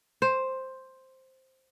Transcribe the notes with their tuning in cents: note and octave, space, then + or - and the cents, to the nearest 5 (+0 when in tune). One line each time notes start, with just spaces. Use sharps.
C5 +5